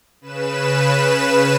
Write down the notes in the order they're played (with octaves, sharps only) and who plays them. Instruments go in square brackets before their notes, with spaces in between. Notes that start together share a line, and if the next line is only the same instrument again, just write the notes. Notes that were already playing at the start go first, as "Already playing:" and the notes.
[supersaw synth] C#3 B4 E7